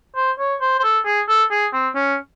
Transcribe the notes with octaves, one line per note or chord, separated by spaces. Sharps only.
C5
C#5
C5
C5
A4
G#4
A4
G#4
C4
C#4